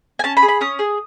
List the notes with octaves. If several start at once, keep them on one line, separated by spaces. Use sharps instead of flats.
G#5
C#4 A5
B5
G#4
B5
C#4 D#6
G#4